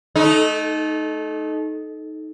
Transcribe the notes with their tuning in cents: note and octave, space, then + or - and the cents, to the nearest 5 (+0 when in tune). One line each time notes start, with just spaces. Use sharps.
A3 -25 D#4 +0